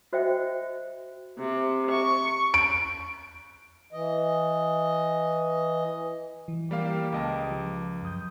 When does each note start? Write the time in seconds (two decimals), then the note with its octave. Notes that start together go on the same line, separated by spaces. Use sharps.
0.13 F#4 C5 D#5 E5 G5
1.38 C3
1.90 C#6
2.54 D7
3.93 E3 D#5
6.48 E3
6.71 G3 A#3 G4 F5
7.13 C#2 D#5 A5
7.51 F3
8.03 F#2 D#6 G6